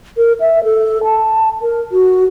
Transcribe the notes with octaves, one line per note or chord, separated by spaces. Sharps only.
A#4
E5
A4
A5
A#4
F#4